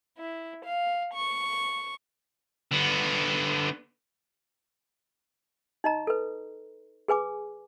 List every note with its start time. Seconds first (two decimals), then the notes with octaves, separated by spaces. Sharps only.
0.18 E4
0.65 F5
1.14 C#6
2.72 D3 B3
5.84 D#4 D#5 A#5
6.07 A4 B4
7.08 G#4 B4 G#5 D6